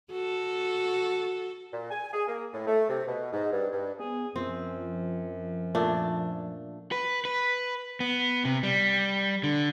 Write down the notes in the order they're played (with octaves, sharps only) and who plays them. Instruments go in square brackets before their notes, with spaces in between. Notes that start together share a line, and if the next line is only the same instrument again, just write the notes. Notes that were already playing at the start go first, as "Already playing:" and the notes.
[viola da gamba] F#4 A4
[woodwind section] A#2
G#5
G#4
A#3
A2
A3
C3
B2
G#2
G2
G2
[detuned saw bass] B3 [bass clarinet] G#4
[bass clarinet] F#2 [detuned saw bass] F3 [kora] C4
[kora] A#2 A3 D4
[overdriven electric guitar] B4
B4
B3
C3
G3
D3